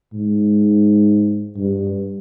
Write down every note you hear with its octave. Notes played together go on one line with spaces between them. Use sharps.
G#2
G2